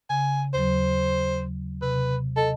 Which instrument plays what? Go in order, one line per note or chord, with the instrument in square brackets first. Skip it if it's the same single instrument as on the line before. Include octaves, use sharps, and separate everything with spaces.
[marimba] C#3 [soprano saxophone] G#5
[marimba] D#2 F#3 [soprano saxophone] C5
[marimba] C3 [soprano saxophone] B4
[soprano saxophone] A4 [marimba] D#5 A5